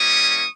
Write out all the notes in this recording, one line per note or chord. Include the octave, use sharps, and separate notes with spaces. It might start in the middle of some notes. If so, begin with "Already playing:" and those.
Already playing: G3 A#3 C#4 E4 C#6 D#6